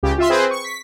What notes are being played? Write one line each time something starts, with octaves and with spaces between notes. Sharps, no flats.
C#2 C#3 G4
F4 E5 C6
C4 G#4 B4 C5
C#6
B6